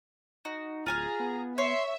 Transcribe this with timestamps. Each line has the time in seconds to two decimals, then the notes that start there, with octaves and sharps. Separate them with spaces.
0.45 D#4 F#4
0.86 D1 F4 G#4 G#5 A#5 F6
1.20 B3
1.58 C#5 E5 C6